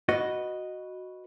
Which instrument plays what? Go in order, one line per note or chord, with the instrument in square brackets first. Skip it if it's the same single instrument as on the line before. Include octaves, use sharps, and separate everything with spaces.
[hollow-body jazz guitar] F#4 B4 D#5